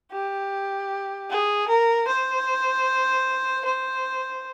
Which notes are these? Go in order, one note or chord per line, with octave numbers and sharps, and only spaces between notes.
G4
G#4
A#4
C5
C5